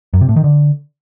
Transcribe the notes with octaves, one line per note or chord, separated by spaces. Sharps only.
F#2
C3
A2
D#3
D3